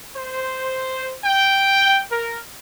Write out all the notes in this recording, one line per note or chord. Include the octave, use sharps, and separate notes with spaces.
C5
G5
A#4